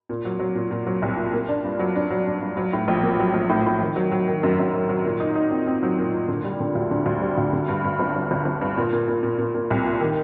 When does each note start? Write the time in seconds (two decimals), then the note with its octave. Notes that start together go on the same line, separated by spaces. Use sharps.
0.09 A#2
0.25 F#3
0.39 F#3
0.55 A#2
0.71 A#2
0.87 F#3
1.02 C2
1.17 A#2
1.33 A#3
1.49 D4
1.64 G2
1.79 F#3
1.96 D4
2.10 F#3
2.27 D4
2.41 G2
2.57 F#3
2.73 A2
2.88 A#1
3.03 A#3
3.20 F#3
3.34 A#1
3.49 A2
3.66 A2
3.81 D#3
3.96 F#3
4.11 F#3
4.28 D#3
4.43 F#2
4.59 F#2
4.73 F#3
4.89 F#3
5.05 A#2
5.20 D#4
5.35 D#4
5.51 C4
5.67 C4
5.83 F#3
5.99 A#2
6.14 A#2
6.28 D3
6.44 G3
6.60 D3
6.75 D2
6.91 D3
7.06 D2
7.22 G3
7.38 D2
7.53 D3
7.68 G2
7.84 G2
7.99 G1
8.15 G2
8.31 G1
8.45 G1
8.61 G2
8.77 A#2
8.93 A#2
9.08 A#2
9.23 A#2
9.38 A#2
9.54 A#2
9.70 C2
9.85 A#2
10.00 D#3